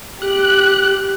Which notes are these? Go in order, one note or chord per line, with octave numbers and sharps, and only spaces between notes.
G4 F#6